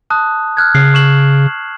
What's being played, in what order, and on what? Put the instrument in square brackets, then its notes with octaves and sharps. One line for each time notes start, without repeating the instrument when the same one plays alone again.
[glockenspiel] A5 D#6 F#6
F6 F#6 G#6
[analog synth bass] C#3 [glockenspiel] F#6 C7
[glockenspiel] C#6 E7 F#7